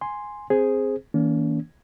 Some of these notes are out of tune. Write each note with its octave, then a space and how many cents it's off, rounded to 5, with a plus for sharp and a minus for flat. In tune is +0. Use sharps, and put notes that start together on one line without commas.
G#5 +0 C6 +0
C4 +0 G#4 +0 C5 +0
E3 -45 A#3 +0 C#4 +45